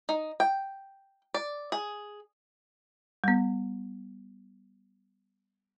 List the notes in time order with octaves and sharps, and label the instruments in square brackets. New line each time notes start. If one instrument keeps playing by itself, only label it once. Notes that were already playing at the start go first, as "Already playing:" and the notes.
[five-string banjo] D#4
G5
D5
G#4
[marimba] G3 B3